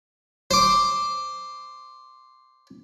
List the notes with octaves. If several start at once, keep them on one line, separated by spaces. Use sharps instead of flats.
C5 D6